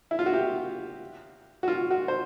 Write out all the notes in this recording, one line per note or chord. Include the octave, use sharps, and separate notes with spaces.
E4
F4
F#4
G4
F#4
F4
F#4
C5